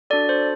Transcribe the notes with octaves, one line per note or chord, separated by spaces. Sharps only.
D4 F#4 A4 D5
C5